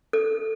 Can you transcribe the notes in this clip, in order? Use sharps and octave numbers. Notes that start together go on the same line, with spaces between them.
A4